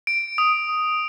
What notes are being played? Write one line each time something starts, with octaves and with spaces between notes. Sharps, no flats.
D7
D#6